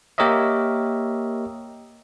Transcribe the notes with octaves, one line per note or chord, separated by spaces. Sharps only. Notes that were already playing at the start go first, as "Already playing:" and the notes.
A#3 G4 A#4 C#5 D#5 E5